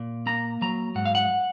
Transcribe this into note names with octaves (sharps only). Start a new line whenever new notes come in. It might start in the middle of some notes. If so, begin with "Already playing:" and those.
Already playing: A#2
A#3 A#5
F#3 A#5
G#2 F#5
F5
F#5